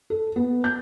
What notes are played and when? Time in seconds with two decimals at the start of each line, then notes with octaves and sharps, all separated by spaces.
0.10 A4
0.36 B3
0.64 G6